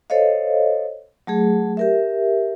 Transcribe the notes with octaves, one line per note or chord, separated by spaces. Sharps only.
A4 C5 C#5 D#5 F5
F#3 A3 G#4
G4 A#4 E5